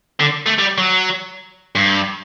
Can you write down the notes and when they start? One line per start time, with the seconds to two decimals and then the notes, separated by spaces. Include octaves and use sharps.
0.20 D3
0.46 A3
0.59 G3
0.78 F#3
1.75 G2